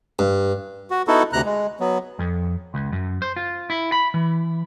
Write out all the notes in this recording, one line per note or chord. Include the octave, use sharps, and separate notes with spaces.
G2
F#4
B3 D#4 E4 F#4 A4
D2 C3 A#5 F#6
G#3
F#3 B3
F2
C#2
F#2
C5
F4
E4
B5
E3